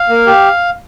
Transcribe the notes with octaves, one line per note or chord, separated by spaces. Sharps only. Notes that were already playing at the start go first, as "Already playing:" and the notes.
Already playing: F5
A#3
G4